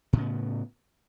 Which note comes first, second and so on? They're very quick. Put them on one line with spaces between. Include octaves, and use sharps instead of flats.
A2 C#3 B3